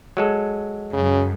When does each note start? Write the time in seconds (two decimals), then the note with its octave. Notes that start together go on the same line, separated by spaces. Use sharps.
0.17 F#3 G#3 A4
0.93 F#2 C#3